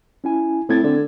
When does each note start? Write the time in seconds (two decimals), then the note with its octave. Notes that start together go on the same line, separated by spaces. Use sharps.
0.24 C#4 E4 G#5
0.69 A2 C4 G#6 A6
0.84 D3